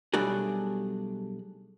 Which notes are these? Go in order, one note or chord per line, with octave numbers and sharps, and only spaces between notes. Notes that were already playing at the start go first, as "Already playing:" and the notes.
B1 G3 A3 D4 F#4 G#4